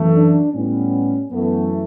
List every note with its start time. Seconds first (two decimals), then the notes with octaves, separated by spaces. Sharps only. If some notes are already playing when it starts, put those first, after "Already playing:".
Already playing: F#2 E3 A3
0.13 D4
0.52 A2 G3 B3 C#4
1.30 F#2 E3 A3 B3